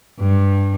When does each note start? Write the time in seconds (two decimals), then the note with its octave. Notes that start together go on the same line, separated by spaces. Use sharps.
0.20 G2